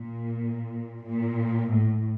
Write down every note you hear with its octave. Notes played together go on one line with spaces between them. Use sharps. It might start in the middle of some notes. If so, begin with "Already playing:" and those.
Already playing: A#2
A#2
A2